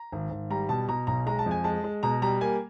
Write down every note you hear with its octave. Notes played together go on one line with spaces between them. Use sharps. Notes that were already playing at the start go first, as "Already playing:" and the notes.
Already playing: A#5
G#1
G#1
G3 A#5
B2 A5
B2 A#5
B1 A#5
G#3 A#5
A5
F2
G#5
G#3 A5
G#3
B2 A#5
G3 A#5
A#3 G#5